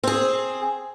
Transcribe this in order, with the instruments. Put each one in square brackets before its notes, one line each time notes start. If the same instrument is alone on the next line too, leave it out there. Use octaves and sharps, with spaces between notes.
[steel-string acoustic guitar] C4 G#4